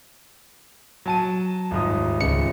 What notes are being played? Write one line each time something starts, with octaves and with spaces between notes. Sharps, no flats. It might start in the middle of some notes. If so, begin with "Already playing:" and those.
F#3 A5 D#7
D#1 G#2 D#6
C#2 C#7